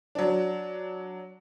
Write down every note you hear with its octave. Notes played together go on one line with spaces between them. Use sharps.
F#3 D4